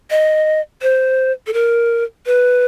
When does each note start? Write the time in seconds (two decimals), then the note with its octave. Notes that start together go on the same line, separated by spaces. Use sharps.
0.11 D#5
0.82 C5
1.47 A4
1.53 A#4
2.26 B4